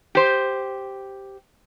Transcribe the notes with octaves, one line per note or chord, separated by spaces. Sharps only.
G4 C5